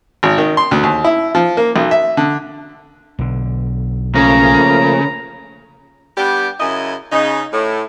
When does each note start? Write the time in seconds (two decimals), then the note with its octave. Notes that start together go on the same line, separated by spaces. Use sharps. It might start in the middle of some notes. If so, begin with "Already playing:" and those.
0.23 G#1
0.38 D#3
0.57 C6
0.71 D2
0.83 D#2
1.04 E4
1.35 F3
1.57 A#3
1.76 B1
1.91 E5
2.17 D3
3.19 B1 D3
4.15 C#3 F3 A3 A#3 A#5
6.17 G3 B3 D4 G4
6.60 F#2 C#3 E4 D#5
7.12 C#3 D#4
7.53 A2